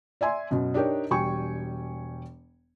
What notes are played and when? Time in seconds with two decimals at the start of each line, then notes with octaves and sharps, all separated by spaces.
0.21 D5 E5 G#5 C6
0.51 F#2 B2
0.74 D4 D#4 G4 A#4 C#5
1.10 E1 G3 G5 G#5 C#6